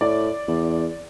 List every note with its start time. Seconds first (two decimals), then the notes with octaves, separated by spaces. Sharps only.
0.01 A2 D5
0.48 E2